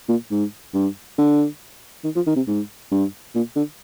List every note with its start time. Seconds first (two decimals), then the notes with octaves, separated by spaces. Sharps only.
0.09 A#2
0.31 G#2
0.74 G2
1.18 D3
2.04 D#3
2.16 F3
2.27 D#3
2.36 C3
2.47 G#2
2.91 G2
3.35 A#2
3.56 D3